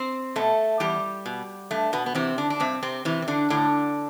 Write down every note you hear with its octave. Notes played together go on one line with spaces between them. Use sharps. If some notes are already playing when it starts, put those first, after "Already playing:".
Already playing: C4 C5
B2 A3 A4
E2 G3 G4
B2
G2 A3
B2 B3
B3
C3 E3 C4
D3 D4
D4
G2 C3 C4
C3 C4
C3 E3 C4
C4
D3 D4
A2 D3 D4